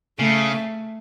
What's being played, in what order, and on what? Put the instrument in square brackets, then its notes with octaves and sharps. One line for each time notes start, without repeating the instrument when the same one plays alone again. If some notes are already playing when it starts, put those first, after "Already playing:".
[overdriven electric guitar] C#3 [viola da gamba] A3